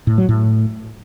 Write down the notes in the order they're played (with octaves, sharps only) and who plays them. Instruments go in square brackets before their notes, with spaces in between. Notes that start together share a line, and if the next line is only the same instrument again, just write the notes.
[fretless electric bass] A2
F#3
A2